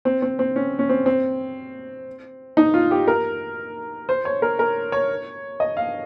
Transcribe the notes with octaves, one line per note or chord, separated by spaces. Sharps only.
C4
C4
C4
C#4
C#4
C4
C4
D#4
F4
G4
A#4
C5
C#5
A#4
A#4
C#5
D#5
F5